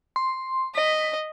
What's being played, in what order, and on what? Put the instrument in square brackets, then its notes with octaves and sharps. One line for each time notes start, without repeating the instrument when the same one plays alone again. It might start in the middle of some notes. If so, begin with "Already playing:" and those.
[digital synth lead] C6
[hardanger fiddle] D#5 [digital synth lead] B6